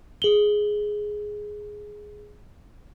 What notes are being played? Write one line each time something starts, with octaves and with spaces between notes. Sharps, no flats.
G#4 F#7 G7